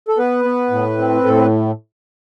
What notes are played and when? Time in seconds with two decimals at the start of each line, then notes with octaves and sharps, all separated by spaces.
0.08 A4
0.18 B3 B4
0.45 B3
0.70 A2
0.98 C4
1.24 A2 A4
1.37 B4